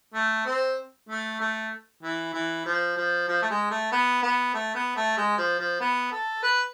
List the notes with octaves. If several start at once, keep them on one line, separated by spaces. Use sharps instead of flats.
A3
C4
A3
A3
E3
E3
F3
F3
F3
A3
G#3
A3
B3
B3
A3
B3
A3
G#3
F3
F3
B3
A4
B4